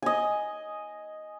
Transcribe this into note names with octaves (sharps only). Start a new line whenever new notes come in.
D#5 G#5